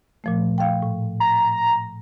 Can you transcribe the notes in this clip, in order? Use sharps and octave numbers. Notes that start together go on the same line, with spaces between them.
A#2 F3 A3
F5 G5
A2
A#5